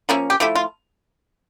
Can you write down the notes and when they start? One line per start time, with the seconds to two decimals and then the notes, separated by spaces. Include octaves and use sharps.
0.09 F3 A#3 C#4 E4
0.30 G4
0.40 F3 A3 E4 G4
0.55 F4